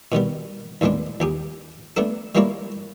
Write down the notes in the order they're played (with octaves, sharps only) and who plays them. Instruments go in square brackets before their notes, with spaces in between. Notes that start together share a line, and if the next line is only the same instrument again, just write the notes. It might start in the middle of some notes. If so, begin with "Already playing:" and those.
[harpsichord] B2 D#3 G3 B3
D#2 A2 G#3 B3 D4
D#2 G4 G#4
A3 B3 D4 A4
G3 G#3 A#3 E4 C#5 D5